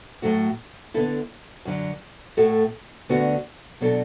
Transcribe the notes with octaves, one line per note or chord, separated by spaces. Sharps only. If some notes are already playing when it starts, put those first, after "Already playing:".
A2 F#3 A3 F#4
D3 B3 E4 A4
F#2 D3 F#3
A2 A3 F#4 A4
D2 D3 B3 D4 F#4
B2 F#3 D4 A4